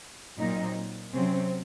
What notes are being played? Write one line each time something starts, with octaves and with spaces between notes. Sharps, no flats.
A#2 F#3 C4 D#4
C3 F#3 C4 C#4